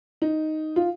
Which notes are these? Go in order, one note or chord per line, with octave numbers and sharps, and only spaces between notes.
D#4
F4